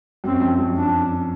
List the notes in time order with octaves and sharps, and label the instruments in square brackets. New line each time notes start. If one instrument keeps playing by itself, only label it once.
[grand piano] F#2 [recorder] C4
[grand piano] F2
F#2
[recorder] D4